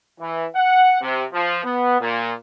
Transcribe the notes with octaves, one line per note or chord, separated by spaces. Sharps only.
E3
F#5
C3
F3
B3
A#2